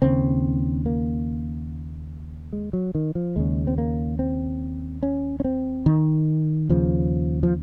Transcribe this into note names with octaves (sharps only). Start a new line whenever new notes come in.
D#2 C#3 C4
A#3
G#3
F#3
D#3
F3
D#2 C#3 G#3
C4
A#3
C4
C#4
C#4
C4
D#3
D#2 C#3 F3
F3